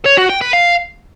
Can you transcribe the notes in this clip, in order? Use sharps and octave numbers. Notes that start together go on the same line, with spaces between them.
C#5
F#4
G5
B4
F5